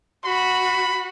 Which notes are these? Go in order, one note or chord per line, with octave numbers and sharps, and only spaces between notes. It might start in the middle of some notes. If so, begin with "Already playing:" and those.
F#4 B5